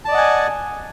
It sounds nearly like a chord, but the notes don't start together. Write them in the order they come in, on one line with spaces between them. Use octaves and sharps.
A5 D5 D#5 F#5 G#5